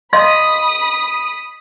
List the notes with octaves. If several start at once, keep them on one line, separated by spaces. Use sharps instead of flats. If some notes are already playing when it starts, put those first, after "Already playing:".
D#5 F5 B5 C6 D#6